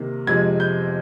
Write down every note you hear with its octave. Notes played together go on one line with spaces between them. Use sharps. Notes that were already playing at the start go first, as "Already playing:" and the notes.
Already playing: C3 D#3 A#3
F2 C3 F3 G#3 G#6
G6